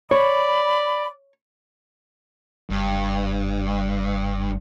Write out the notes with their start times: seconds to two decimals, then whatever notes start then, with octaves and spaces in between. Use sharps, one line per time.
0.11 C#5 D5 B5
2.70 F#1 G2